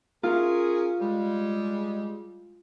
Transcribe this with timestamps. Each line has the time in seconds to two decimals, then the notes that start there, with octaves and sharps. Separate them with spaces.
0.23 C#4 F4 G#4 A#4
1.00 G3 G#3